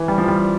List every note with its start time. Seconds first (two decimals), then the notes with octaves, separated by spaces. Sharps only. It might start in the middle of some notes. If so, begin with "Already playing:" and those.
Already playing: E3
0.08 G3
0.18 F3
0.28 G3